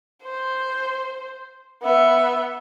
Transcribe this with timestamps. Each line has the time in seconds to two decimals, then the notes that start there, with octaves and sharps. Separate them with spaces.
0.24 C5
1.83 B3 E5